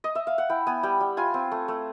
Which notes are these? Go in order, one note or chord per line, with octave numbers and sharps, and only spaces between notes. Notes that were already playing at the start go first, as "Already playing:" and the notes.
D#5
E5
F5
F#5
E4 G5
B3 G#5
G3 G5
G3
F4 G#5
C4
A3
A3